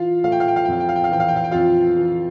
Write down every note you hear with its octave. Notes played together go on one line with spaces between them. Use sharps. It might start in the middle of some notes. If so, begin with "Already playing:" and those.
Already playing: E3 F4 F5
A3 F5
G5
F5
G5
F5
G5
F2 F5
G5
F5
G5
F5
E3 G5
F5
G5
F5
G5
F2 F4 F5
E3